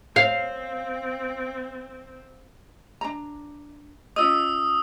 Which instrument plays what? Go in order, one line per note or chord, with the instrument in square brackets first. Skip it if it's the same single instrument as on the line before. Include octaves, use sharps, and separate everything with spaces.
[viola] C4 [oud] F5
[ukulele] D4 A#5
[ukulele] C#4 F4 D#5 [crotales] D#6 E6